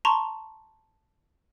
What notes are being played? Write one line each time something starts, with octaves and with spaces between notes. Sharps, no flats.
A5 A#5 C6 C#6